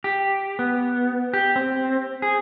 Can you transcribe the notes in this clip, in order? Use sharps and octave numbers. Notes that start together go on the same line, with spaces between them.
G4
B3
G4
C4
G#4